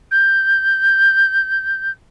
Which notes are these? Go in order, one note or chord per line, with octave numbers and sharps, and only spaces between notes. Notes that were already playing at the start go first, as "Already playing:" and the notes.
G6